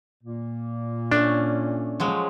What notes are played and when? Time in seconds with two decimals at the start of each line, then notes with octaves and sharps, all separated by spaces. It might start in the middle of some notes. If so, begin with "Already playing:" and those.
0.24 A#2 A#3
1.12 A3 C#4 D4
2.00 F3 F#3 G#3